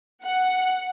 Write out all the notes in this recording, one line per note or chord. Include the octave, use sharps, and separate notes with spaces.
F#5